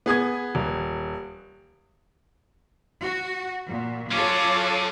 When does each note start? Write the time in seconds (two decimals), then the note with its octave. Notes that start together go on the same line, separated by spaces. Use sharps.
0.06 B3 G#4 D#6 G#6
0.55 D#1
3.02 F#4
3.36 F#5
3.69 A#2 F#4
4.12 F#3 C#4 F4 A4 C#5 D6